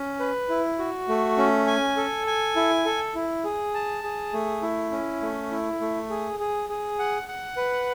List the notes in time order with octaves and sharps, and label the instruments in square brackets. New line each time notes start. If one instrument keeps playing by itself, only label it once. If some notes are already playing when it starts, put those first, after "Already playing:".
Already playing: [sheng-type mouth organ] C#4
B4
E4
F#4
A3
C#4
G#5
A4
G#5
E4
A4
E4
G#4
A5
G#4
A3
E4
C#4
A3
E4
A3
G#4
G#4
G#4
F#5
F#5
B4